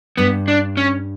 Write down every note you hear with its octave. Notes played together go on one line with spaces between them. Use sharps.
G2 B3
D4
C#4